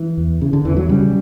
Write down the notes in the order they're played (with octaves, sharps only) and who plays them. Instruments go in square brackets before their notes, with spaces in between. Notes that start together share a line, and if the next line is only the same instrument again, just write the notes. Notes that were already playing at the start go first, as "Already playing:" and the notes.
Already playing: [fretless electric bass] E3
E2
C#3
D3
E2 E3
F#3
C#3 G3